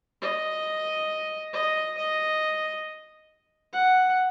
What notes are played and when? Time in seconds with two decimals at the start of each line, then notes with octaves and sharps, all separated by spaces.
0.22 D#5
1.53 D#5
1.97 D#5
3.73 F#5